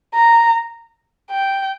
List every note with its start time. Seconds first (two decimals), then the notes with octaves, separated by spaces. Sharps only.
0.14 A#5
1.30 G5